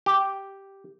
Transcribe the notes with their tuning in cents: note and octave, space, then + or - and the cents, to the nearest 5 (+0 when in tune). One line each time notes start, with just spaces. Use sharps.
G4 -5